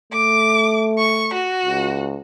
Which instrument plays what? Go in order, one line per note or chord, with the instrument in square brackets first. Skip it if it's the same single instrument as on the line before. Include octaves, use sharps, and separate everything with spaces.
[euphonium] A3 [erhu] D6
[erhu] C#6
F#4
[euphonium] C#2